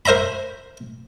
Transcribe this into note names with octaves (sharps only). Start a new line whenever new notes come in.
A#4 C5 E5 A#5 B5